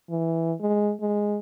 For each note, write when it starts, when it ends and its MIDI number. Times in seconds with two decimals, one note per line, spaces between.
0.10 0.53 52
0.61 0.93 56
1.01 1.39 56